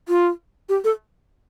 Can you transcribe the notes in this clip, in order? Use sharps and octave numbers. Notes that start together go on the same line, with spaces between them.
F4
G4
A4